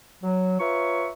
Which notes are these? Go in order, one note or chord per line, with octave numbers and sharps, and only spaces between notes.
F#3
F4 B4 C#5 E5 A#5 C#6